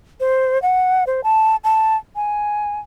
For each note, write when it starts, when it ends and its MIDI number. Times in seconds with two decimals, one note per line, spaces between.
0.20 0.61 72
0.62 1.04 78
1.07 1.21 72
1.24 1.56 81
1.64 1.97 81
2.16 2.80 80